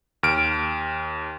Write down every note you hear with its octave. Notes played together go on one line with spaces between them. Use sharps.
D#2 F6 D7